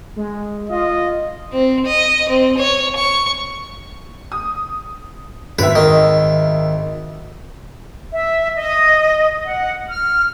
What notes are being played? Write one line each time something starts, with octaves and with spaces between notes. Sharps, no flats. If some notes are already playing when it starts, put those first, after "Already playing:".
G#3
F4 D#5
C4
D#5
C4
C#5
C#6
D#6
G#1 B4 E5
D#3
E5
D#5
F#5
F6